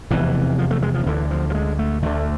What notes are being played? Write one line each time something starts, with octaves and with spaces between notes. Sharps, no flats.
F1 E2 C3 E3
F3
A3
G#3
F3
D2 D3 E3
F3
F3
G#3
A3
D2 D3 A3